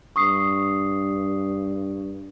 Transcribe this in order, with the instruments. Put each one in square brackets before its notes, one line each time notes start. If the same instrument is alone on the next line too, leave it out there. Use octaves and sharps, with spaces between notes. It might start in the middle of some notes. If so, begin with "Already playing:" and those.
[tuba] G2 [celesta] C#6 D#6 C7